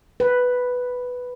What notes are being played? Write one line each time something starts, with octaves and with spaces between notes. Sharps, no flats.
B4